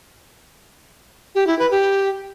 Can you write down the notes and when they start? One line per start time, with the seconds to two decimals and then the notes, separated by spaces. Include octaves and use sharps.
1.35 G4
1.47 E4
1.59 B4
1.71 G4